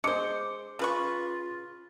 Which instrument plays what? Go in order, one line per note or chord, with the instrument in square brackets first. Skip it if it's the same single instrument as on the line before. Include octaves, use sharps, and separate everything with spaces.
[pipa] G#3 C5 [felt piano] D6 C#7
[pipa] C#3 B4 C#6 [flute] F4